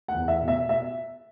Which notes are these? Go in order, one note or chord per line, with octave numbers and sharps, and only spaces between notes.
F#5
E2
E5
B2
E5
E5